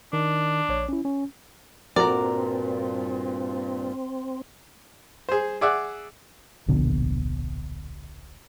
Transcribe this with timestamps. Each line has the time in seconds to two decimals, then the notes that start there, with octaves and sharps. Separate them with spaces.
0.13 D#3 D4
0.69 A#1 C#5
0.89 C#4 E4
1.05 C#4
1.96 G2 A#2 C4 F#4 A#4 D5 A#5
5.29 G#4 C5
5.61 G#4 D5 E5 F#5
6.68 D1 A#1 B2 D3